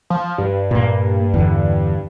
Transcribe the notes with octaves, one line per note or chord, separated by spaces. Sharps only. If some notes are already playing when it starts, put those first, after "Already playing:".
F3
G2
A#2 A#3
E2 D3